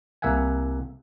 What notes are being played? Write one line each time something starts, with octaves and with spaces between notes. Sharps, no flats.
C2 A#3 E5 F#5 G#5